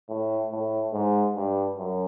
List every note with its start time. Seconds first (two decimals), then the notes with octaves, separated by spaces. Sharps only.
0.09 A2
0.51 A2
0.93 G#2
1.36 G2
1.78 F#2